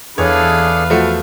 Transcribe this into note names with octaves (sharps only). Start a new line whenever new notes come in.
E2 D4 G#4 A4 B4 C#5 F5
F3 A3 F#4